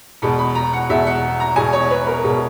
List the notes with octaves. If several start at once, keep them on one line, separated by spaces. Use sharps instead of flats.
E2 B2 G#3 B5
B5
A#5
F#5
E2 B2 G#3 E5
F#5
A#5
E2 B2 G#3 G#5
C#5
B4
A#4
B2 G#3